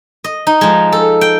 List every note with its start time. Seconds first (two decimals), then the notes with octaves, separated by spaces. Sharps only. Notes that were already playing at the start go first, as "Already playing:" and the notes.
0.24 D#5
0.47 D#4
0.61 F3 G#3
0.92 A4
1.21 G5